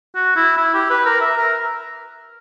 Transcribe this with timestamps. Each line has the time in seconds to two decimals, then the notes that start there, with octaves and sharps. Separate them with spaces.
0.15 F#4
0.36 E4
0.57 E4
0.74 G4
0.90 B4
1.05 A#4
1.21 E5
1.37 A#4